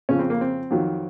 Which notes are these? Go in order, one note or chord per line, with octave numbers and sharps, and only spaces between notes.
F2 C#3 F3 C#4
C4
A#3
C4
F2 D#3 F#3